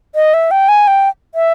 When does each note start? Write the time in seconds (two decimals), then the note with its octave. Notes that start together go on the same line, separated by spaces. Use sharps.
0.15 D#5
0.34 E5
0.51 G5
0.69 G#5
0.87 G5
1.35 E5